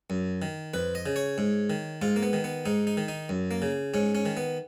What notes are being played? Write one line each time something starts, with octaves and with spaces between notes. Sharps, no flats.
F#2
D#3
F2 B4
D#5
C#3
C#5
G#2
D#3
G#2 F4
A#3
B3
D#3
B3
G#2 D#4
D#4
D#3
D#4
F#2
A#3
C#3
G#2 C#4
C#4
D#3
B3